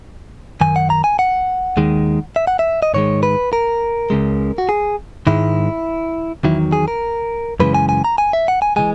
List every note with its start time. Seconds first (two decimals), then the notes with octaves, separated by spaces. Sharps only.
0.61 F#2 D#3 G#5
0.76 F#5
0.90 A#5
1.04 G#5
1.19 F#5
1.77 D#2 D#3 G#3
2.36 E5
2.47 F#5
2.59 E5
2.83 D#5
2.94 G#2 D#3 G#3 C#5
3.23 B4
3.53 A#4
4.10 C#2 C#3 G#3
4.58 F#4
4.69 G#4
5.27 G#2 D#3 G#3 E4
6.44 E2 D#3 F#3 E4
6.73 G#4
6.88 A#4
7.60 F#2 C#3 E3 G#3 B4
7.74 G#5
7.89 G#5
8.04 A#5
8.18 G#5
8.33 E5
8.48 F#5
8.62 G#5
8.76 C#3 E3 G#3 G#5